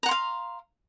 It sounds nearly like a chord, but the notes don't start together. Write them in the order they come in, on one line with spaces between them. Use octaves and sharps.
A#5 F#5 C6 F5